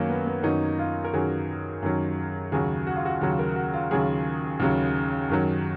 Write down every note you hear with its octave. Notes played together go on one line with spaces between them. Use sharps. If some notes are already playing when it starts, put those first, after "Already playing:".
Already playing: F#2 D#3 F#3 A#3 C#4
B3
B3
F#2 D#3 F#3 D#4
F4
A#4
F#2 D#3 F#3 G#4
F#2 D#3 F#3
D#2 C#3 F#3 G#4
F#4
F4
F#4
D#2 C#3 F#3
A#4
F#4
F4
D#2 C#3 F#3 G#4
D#2 C#3 F#3
F#2 D#3 F#3